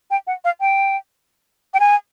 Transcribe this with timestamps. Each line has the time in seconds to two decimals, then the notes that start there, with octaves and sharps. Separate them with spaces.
0.11 G5
0.27 F#5
0.45 F5
0.61 G5
1.74 G5
1.80 G#5